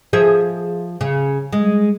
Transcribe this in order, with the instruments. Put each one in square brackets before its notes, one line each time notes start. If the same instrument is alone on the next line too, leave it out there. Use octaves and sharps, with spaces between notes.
[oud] F3 G#4 E5
C#3
G#3